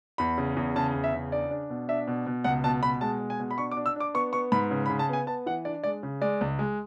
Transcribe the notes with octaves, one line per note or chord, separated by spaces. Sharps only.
E2 B5
C#3
E2
C#3 A5
E2
E5
C#3
D4 D5
D4
B2
D4 E5
B2
B2
C#2 F#5
B2 A5
B2 B5
G#3 A5
B2
G#5
B2
B5
D4 C#6
D6
D4
E6
D4 D6
B3 C#6
B3 C#6
G#2 B5
C#3
B5
C#3
A5
B3 G#5
B3 A5
E3 F#5
D4 D5
G#3 D5
C#3
G#3 D5
C#2
G#3